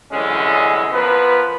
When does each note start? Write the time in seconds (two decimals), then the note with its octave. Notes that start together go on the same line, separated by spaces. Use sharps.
0.11 C2 D3 E3 F#3 G#3 C#4
0.93 F3 B3 A#4 B4